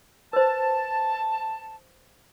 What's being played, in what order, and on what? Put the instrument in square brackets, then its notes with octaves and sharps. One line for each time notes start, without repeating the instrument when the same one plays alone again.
[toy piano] B4 C5 [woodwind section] A5